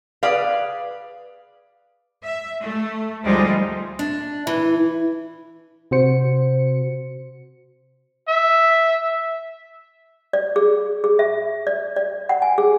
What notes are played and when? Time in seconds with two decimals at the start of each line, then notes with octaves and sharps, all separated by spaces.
0.23 G#4 B4 D5 F5
2.24 E5
2.62 A3
3.26 D2 F3 G3 G#3 D#4
3.99 D4
4.47 E3
5.91 C3 F#4 C5 C#7
8.29 E5
10.33 D5
10.56 G#4
11.04 G#4
11.19 E5
11.67 D5
11.96 D5
12.29 F#5
12.42 G#5
12.58 G#4